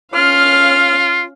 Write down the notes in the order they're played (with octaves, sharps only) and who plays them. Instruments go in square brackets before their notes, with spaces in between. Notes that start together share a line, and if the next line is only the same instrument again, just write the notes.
[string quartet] C#4 F5 F6 [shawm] F4